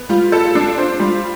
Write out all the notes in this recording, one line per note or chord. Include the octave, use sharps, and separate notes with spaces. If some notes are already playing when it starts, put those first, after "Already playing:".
Already playing: B3
G3 F4
A4
D4
C5
G3